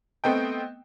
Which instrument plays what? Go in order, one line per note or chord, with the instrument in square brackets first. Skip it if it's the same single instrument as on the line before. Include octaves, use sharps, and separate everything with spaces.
[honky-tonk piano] A3 B3 C4 D#5 G5